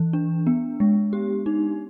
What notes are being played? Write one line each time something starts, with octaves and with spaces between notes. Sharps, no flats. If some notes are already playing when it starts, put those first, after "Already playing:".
Already playing: E3
D4
B3
G#3
G4
D#4